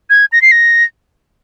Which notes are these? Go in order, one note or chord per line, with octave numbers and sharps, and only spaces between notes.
G#6
A#6
C7
A#6